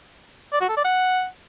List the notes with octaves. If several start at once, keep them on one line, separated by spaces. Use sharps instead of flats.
D5
F#4
A4
D5
F#5